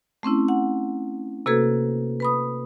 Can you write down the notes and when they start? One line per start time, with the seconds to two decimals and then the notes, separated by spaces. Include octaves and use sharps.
0.23 A3 C4 C#4 E4
0.48 F#5
1.46 C3 A#3 F#4 A4 B4 G#6
2.20 B4 B5 D#6